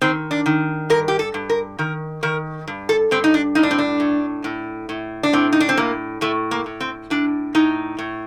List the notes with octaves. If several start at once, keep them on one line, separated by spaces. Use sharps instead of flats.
D#3 C4
D4
D#3
G2 A#4
G4
A4
G2
A#4
D#3 A#4
D#3 A#4
G2
A4
G2 C4
D#4
D4
A2 D#4
D4
C4
D4
A2
A2
A2
D4
A2 C4
D#4
D4
C4
A2 A#3
A2 A3
A#3
A2
C4
A2 D4
A2 D#4
A2